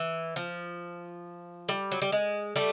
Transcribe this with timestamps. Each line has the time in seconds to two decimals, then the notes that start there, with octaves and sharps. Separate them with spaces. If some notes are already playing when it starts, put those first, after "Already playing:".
Already playing: E3
0.36 F3
1.69 G3
1.92 F#3
2.02 G3
2.12 G#3
2.56 G3 A3